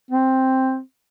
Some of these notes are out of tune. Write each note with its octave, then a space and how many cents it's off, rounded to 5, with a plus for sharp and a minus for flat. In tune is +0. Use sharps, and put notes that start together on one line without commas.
C4 +5